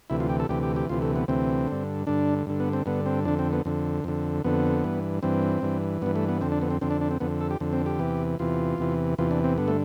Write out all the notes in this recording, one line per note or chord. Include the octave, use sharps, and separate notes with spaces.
D2 C3 E3 E4
F4
G4
A4
D2 C3 E3 G4
G4
G4
D2 C3 E3 F4
A3
B3
D2 C3 E3 C4
G2 D3
G2 D3 D4
G2 D3
B3
C4
G2 D3 B3
C4
F2 D3 D4
C4
B3
F2 D3
F2 D3
F2 D3 B3
G2 E3
G2 E3 C4
G2 E3
G2 E3 B3
A3
B3
F2 D3 C4
D4
B3
C4
F2 D3 C4
D4
D4
C4
F2 D3 B3
A4
G4
F2 D3
C4
G4
E2 C3 E3
E2 C3 E3 F4
E2 C3 E3
E2 C3 E3 F4
D4
C4
G2 D3 B3
A3